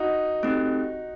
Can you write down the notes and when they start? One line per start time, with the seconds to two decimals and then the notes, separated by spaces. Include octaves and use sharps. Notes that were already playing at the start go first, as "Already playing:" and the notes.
Already playing: D#4 F#4
0.43 A3 C4 D#4 G4